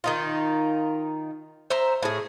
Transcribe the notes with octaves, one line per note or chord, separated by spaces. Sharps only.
D#3 D#4 F4
C5 E5 A#5
A2 G#4